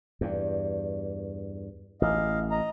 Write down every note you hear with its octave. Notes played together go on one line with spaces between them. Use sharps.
E2 G2
A1 D#5 F5
D#5 A#5